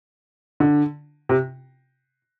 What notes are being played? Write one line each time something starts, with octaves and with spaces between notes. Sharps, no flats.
D3
C3